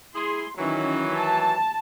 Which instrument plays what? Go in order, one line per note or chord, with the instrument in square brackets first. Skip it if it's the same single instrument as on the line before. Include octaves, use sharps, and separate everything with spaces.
[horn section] E4 G#4 [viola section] C6
[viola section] D#3 C#4 [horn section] E3 F#3
[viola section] A5